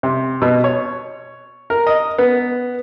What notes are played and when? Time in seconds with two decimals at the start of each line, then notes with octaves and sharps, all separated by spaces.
0.03 C3
0.42 B2
0.64 C#5
1.70 A#4
1.87 D#5
2.18 B3